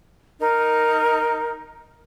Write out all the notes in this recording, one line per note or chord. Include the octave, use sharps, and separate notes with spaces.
D#4 A#4